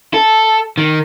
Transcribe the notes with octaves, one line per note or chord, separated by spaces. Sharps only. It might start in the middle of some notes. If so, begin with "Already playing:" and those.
A4
D#3